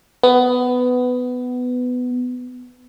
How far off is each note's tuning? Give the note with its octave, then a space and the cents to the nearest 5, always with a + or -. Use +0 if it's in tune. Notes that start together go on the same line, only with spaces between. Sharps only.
B3 +15